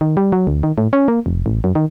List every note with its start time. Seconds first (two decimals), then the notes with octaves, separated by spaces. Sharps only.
0.01 D#3
0.17 G3
0.32 F#3
0.47 D2
0.63 D#3
0.78 A2
0.93 C#4
1.08 A#3
1.26 F1
1.46 A1
1.64 F#2
1.75 D#3